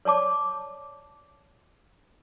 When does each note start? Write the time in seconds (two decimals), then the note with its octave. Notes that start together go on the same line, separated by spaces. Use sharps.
0.05 C#5 D5 A5 D6